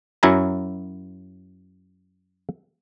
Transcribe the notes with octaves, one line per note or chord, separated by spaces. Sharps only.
F#2 F#3 E4 G#5 A#5